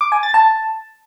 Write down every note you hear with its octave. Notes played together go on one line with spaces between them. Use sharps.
D6
G#5
A6
A5